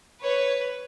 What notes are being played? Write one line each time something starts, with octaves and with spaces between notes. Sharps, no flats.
B4 C#5